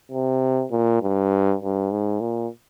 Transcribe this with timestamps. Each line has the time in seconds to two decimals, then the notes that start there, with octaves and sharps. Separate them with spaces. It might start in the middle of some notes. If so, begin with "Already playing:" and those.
0.12 C3
0.72 A#2
1.02 G2
1.61 G2
1.91 G#2
2.20 A#2